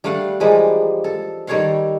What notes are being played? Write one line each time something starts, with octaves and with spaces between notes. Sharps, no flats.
G3 A3 D4 F5 F#5
E3 F3 G3 G#3 A#3
A4
D#3 G3 A4 C#5 F#5 C6